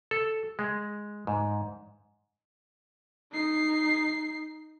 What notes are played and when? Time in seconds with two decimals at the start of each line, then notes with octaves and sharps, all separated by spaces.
0.11 A4
0.59 G#3
1.27 G#2
3.32 D#4 C7